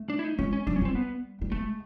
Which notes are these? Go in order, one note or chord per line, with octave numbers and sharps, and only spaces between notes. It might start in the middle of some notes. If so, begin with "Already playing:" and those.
Already playing: A3
D4
E4
D#4
G#3 C#4
C#4
G3 D4
C#4
G3 C4
B3
G3
G#3 A3